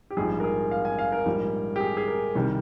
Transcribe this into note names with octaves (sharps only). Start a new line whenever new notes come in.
G4
A#1 G#2 G3 G#4
A#4
G#4
F5
G#5
F5
A#4
A#1 G#2 G3
G4
G#4
G#4
A#4
C2 C3 D#3 G3